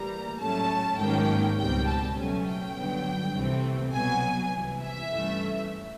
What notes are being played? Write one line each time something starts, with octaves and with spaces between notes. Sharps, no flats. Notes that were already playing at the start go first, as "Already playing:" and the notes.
Already playing: A2 E3 G3 A#3 A#5
A2 F#3 A3 C#4 A5
G#2 D#3 F#3 A#3 C#4 G5
C#2 B2 G3 C4 G5
A5
B2 F#3 A3 C#4 G#5
G5
G2 D3 F#3 B3
C2 C3 E3 A3 C4
B2 F#3 B3 G#5
C2 C3 E3
E5
G2 E3 A3 C#4